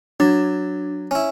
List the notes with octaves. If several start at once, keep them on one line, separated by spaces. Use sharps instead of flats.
F#3 D4
C#4 E4